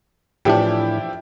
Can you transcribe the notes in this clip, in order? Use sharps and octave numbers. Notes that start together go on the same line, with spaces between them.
A2 E3 F3 D4 E4 G4